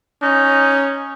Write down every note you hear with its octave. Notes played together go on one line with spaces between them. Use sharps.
C#4 D#4